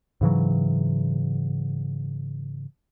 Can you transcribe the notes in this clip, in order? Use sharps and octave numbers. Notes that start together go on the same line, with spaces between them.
G#2 C#3 E3 F#3